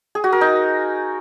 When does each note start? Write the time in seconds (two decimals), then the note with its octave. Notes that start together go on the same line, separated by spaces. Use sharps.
0.15 G#4
0.24 F#4
0.33 A#4
0.41 D#4